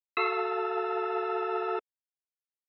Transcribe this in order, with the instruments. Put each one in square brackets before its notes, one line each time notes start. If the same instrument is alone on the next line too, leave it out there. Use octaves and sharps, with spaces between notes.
[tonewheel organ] F#4 A4 F5 A5 E6